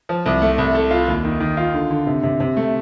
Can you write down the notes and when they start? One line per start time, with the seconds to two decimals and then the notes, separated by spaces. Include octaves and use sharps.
0.09 F3
0.26 C2
0.42 A3
0.58 C2
0.75 A4
0.91 F4
1.08 D#2
1.25 D#3
1.40 D#3
1.57 F4
1.74 D3
1.90 D3
2.07 C3
2.23 C3
2.40 C3
2.57 A3